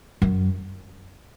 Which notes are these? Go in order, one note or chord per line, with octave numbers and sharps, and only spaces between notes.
F#2